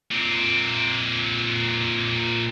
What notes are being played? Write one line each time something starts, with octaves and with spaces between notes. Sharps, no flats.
A#2 C4